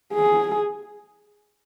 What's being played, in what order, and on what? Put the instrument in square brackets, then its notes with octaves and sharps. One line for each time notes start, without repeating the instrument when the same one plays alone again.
[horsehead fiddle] G#4